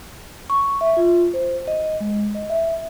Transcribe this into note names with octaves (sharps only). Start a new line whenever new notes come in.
C#6
E5
F4
C5
D#5
G#3
D#5
E5